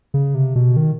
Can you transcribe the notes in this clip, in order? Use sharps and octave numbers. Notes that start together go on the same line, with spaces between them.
C#3
C3
B2
D#3